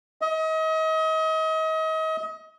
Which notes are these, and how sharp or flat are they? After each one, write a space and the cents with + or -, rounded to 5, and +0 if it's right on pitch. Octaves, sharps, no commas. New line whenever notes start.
D#5 +35